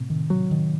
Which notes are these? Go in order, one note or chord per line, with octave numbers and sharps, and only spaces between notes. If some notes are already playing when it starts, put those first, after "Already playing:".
Already playing: A2 C3
D#3
F#3
D#3